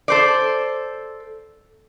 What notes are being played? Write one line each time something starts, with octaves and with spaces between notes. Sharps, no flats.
A4 C5 D5